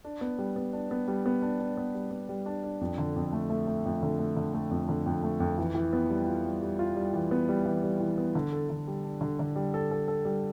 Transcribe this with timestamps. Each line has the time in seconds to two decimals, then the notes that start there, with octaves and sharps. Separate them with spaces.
0.05 D4
0.21 B3
0.38 G3
0.56 B3
0.73 D4
0.91 B3
1.08 G3
1.26 B3
1.42 D4
1.60 D4
1.77 B3
1.94 G3
2.11 B3
2.29 G3
2.46 D4
2.64 D4
2.81 F2
2.98 D3
3.16 F2
3.33 A3
3.50 A3
3.67 A3
3.85 F2
4.03 D3
4.19 A3
4.37 D3
4.54 A3
4.71 F2
4.89 D3
5.06 F2
5.23 A3
5.40 F2
5.58 E3
5.75 E3
5.93 B3
6.10 G3
6.27 F4
6.44 G3
6.62 G3
6.79 F4
6.96 G3
7.14 E3
7.31 B3
7.49 G3
7.66 E3
7.83 G3
8.00 E3
8.18 B3
8.35 D3
8.53 A4
8.69 D3
8.87 G3
9.04 D4
9.21 D3
9.39 D3
9.56 G3
9.74 A4
9.91 A4
10.08 A4
10.25 G3